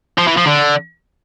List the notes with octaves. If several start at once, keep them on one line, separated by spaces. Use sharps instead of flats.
F3
E3
F3
D3